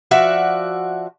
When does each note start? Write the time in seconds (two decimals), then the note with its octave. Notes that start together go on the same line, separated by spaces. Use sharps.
0.11 F3 F#4 D5 E5